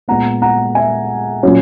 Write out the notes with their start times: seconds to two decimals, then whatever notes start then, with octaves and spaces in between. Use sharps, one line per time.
0.08 A#2 G#3 B3 F#5 A#5
0.42 F#5 A#5
0.75 E5 G#5
1.43 A#2 F#3 C#4